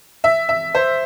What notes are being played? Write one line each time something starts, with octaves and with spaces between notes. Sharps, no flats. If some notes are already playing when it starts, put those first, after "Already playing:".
E5
E5
C5